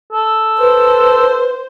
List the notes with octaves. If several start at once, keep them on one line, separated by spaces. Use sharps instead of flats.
A4
B4 C5